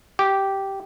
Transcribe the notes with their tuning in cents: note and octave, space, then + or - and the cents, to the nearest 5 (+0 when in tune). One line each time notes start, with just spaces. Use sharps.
G4 -10